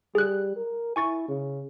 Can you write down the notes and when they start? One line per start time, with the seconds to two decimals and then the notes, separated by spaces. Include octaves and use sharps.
0.15 G3 G#4 F#6
0.56 A#4
0.96 E4 G#5 C#6 A6
1.28 C#3